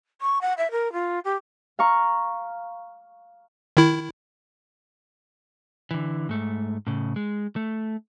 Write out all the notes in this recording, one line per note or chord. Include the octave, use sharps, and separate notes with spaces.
C#6
F#5
E5
A#4
F4
G4
F5 A#5 C#6
D#3 E4
D3 E3
G#2 A3
A2 C#3
G#3
A3